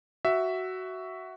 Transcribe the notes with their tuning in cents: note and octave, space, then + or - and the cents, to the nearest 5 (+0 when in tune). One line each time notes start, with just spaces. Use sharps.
F#4 +10 E5 +0